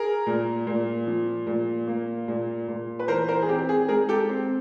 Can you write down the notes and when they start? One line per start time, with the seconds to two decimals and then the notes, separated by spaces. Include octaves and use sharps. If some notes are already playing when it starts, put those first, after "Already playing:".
Already playing: G#4 A#4
0.26 A#2
0.67 A#2
1.07 F3
1.47 A#2
1.87 A#3
2.28 A#2
2.68 A#2
2.99 B4
3.08 E3 A#4 C5
3.28 A#4 C5
3.42 G#4
3.49 C4 G4
3.69 G#4
3.88 G#3 G#4 A#4
4.09 G4 A4
4.29 C4